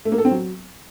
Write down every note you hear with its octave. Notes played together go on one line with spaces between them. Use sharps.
A3
A#3
A4
C4
F#3